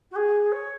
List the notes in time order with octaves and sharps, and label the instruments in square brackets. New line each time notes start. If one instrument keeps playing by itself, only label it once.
[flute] F#4
G#4
C#5